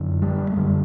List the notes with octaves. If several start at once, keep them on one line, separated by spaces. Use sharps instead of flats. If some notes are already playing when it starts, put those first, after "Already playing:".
Already playing: F#2 D3
G3
A3
F#2 D3 G3